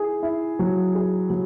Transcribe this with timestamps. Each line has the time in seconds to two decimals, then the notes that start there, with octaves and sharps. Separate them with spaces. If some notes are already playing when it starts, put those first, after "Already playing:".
Already playing: E4 G#4
0.23 E4
0.59 F#3
0.95 G#4
1.30 F#3